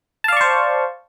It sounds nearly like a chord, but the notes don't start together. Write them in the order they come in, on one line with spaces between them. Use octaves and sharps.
A5 F5 D5 C#6 C5